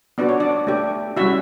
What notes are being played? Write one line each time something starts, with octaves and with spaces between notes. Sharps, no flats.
B3 D4 F#4 D5
C#5
D4 D5
A3 D4 G4
G3 C#4 E4 F#4 E5